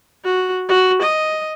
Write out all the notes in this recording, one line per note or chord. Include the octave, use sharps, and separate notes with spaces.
F#4
F#4
D#5